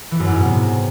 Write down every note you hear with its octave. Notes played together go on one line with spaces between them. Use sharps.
E3
F#2
G#2
B2
C3